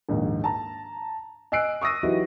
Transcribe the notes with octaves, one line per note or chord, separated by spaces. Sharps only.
A#1 D#2 G#2
A5 A#5
D#5 G#5 E6 F#6 C7 D7
C#6 D#6 E6 A#6 D#7
E3 F#3 D#4 E4 F#4 G4